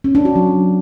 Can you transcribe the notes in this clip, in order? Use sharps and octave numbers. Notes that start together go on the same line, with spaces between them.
C#4
D4
F#4
F#3